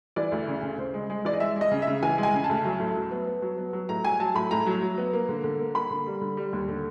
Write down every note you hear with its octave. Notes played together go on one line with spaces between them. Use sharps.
E3 D5
D2
C#3
C#3
C#3 C5
G#3
G#3
E3 D5
D#5
G#3 E5
G#3
D#5
C#3
E5
C#3
E3 G#5
G#3
G#5
C#3
A5
D2
F#3
A2
F#3
B3
B3
F#3
B3
F#3
A2 A#5
F#3 G#5
F#3 A5
A2 B5
A2 A#5
F#3
F#3
B3
A#3
D3
D3
A#3
A#3 B5
D3
G3
D3
G3
D#2
D3